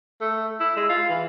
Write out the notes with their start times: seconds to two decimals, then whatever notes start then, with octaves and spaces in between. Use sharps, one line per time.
0.21 A3
0.60 E4
0.76 G#3
0.89 F4
1.09 E3